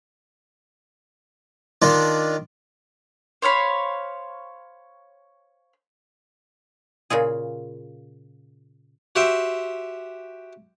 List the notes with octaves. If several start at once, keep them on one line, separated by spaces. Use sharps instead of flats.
D#3 D4 F4 D5
C5 C#5 F5 B5
A#2 C#3 F4 G#4
F#4 G4 C5 E5 G5